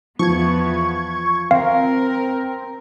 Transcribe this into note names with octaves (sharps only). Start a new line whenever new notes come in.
E2 F3 B3 C#6 G#6
C4 A#4 F5